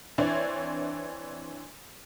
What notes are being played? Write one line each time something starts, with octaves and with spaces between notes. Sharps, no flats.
E3 C4 D4 C#5 D5